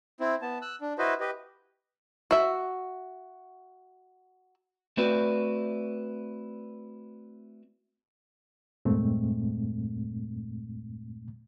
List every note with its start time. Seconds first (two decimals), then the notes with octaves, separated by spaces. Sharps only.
0.20 C4 E4
0.42 B3 A5
0.62 E6 F#6
0.81 D4
0.98 E4 F#4 B4 C5 D#5
1.20 G4 B4 D#5
2.31 F#4 E5
4.97 A3 C4 E4 F#4 B4 D5
8.85 E2 G2 A#2 G#3 A3 C4